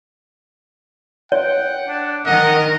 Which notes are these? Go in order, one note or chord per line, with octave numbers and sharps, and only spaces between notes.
C#5 F#5 G5
D4
D#3 A#4 D#5 F#5